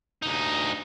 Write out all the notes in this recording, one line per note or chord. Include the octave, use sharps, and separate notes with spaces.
D2 D#4